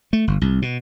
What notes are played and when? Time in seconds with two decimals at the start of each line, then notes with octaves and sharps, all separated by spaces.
0.13 A3
0.27 G1
0.41 C2
0.62 B2